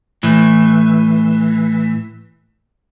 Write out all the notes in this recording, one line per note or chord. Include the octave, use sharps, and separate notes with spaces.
A2 E3